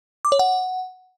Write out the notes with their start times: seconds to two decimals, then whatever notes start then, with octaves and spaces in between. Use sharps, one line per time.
0.25 D6
0.32 C#5
0.39 F#5